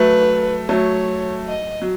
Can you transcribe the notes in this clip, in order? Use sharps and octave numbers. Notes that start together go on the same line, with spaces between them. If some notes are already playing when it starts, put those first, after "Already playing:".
Already playing: F#3 A3 B4
F#3 A3 C#5
D#5
F#3